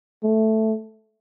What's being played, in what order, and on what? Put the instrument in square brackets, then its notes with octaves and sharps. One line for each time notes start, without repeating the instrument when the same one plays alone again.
[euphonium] A3